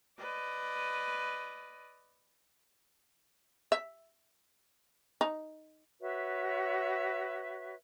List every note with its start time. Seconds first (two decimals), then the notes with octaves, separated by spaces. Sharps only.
0.19 B4 D5 D#5
3.72 E5
5.21 D#4
6.00 F#4 B4 C#5 E5